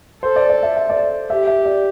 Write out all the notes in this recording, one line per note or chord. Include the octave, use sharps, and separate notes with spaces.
A4 C5
D5
D5
E5
E5
D5
G4 E5
E5
D5